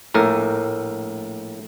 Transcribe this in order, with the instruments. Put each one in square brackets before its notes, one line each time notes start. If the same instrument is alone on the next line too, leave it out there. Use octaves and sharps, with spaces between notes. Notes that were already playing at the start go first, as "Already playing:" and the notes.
[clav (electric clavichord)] A#1 A2 A#4